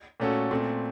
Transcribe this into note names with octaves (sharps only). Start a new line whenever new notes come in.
A#2 A3 C#4 F#4 A4
A#2 A3 C4